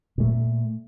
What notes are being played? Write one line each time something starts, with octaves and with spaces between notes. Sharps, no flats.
A#2 A3